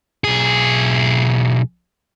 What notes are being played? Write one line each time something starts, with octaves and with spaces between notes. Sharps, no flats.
B1 G#4